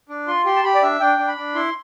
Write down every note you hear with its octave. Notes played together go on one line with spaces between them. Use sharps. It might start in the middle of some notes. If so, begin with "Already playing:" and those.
D4
F4 C6
G4 C6
A5
G4 B5
D5
D4 E5
D4 G5
D4
B5
D4
E4 C6